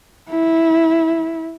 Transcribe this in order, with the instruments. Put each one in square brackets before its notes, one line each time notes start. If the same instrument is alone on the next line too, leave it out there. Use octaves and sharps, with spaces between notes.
[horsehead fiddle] E4